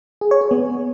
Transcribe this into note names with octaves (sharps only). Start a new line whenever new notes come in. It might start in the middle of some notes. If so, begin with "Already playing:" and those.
G#4
C#5
G#4
B3